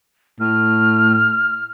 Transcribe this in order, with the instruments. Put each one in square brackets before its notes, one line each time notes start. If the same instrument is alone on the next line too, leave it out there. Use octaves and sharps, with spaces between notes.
[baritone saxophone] A2 [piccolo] F6